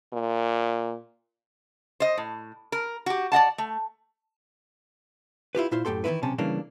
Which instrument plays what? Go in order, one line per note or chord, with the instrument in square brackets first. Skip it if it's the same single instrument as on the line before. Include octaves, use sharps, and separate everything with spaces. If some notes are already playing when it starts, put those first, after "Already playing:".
[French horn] A#2
[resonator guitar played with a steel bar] C5 D#5
A2
A#4
F#4 G4
D5 D#5 F#5 A5
A3
[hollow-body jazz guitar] E4 F4 G4 B4
A#2 E4 F4 C5
F#2 A2 G4 A4 C6
D#3 E3 C4 C#4 E4 B4
B1 C3 C#4 A5
C#3 E3 G3 A#3 D4